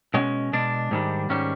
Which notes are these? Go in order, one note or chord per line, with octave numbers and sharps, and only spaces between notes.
B2 G#3 C#4
B2 G#3 D4
G#2 D#3 G3
G#2 D#3 G3 C#4